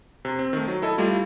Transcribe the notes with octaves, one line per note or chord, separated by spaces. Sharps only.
C3
C4
D#3 A3
F#3
E4 A4 D#5
G3 A3 E4 F4